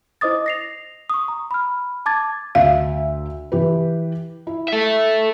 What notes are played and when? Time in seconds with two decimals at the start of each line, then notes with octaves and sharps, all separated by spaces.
0.21 E4 C5 D#5 D6 D#6 A6
0.46 A#6 C7 F7
1.10 C#6 D#6
1.28 A#5
1.51 B5 F6
2.06 A5 D6 G#6 A6
2.55 D2 E5 F5
3.52 E3 G4 B4
4.47 E4
4.68 A4 E5